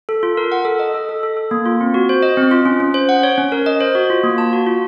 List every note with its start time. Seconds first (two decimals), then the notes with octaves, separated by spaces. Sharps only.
0.09 A4
0.23 F4
0.37 A#4
0.52 F#5
0.65 A4
0.80 D#5
0.94 A4
1.09 A4
1.23 A4
1.37 A4
1.51 A#3
1.66 F4
1.81 C4
1.94 F#4
2.09 C5
2.23 D#5
2.37 C4
2.51 F4
2.65 C#4
2.80 C#4
2.94 C5
3.09 F#5
3.23 C#5
3.38 C#4
3.52 A#4
3.66 D#5
3.81 C5
3.95 F#4
4.10 F4
4.24 A#3
4.38 A5
4.53 F#4
4.66 F4